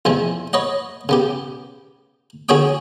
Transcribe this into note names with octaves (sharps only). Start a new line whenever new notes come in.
E2 C3 F3 G#3 A3
B4 C#5 D#5 F#5
C#3 B3 G4
D3 F#4 G#4 C#5 G5 D#6